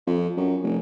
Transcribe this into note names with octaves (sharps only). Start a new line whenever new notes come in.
F2
F#2
F1